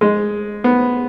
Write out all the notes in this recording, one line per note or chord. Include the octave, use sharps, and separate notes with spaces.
G#3
B3